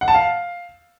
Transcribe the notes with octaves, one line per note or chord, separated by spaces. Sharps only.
F#5
A5
F5